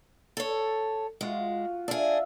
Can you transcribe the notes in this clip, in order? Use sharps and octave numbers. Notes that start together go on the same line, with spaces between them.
A4 C#5
G#3 F4 F#4
D4 G#4 E5 F5